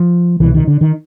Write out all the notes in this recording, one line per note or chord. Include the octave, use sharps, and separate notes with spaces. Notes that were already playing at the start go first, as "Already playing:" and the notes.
Already playing: F3
C2 B2 E3
D#3
D3
D#3